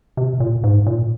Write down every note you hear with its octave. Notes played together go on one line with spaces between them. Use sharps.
C3
A#2
G#2
A#2